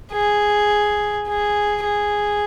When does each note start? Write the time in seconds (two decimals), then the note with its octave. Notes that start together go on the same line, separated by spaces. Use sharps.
0.12 G#4
1.28 G#4
1.85 G#4